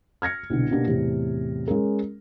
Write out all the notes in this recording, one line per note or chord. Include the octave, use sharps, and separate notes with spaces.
F6 G#6 A#6 C#7
C2 B2 D3
B2 A#3 D4 G4
E2 A2 C3
G#3 C#4 G#4 A#4